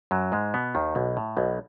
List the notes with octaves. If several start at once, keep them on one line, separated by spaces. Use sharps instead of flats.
F#2 F#3
G#2 G#3
B2 B3
D#2 D#3
B1 B2
A2
B1 B2